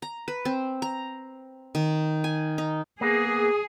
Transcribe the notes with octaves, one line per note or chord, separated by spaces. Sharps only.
A#5
B4
C4
A#5
D#3
G#5
D#4
A#3 B3 G#4